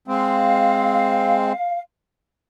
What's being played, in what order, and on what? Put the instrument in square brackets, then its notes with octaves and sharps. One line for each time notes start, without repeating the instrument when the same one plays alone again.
[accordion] G#3 C4 [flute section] F5